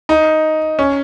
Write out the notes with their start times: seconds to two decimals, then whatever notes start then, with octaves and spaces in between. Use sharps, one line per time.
0.09 D#4
0.79 C#4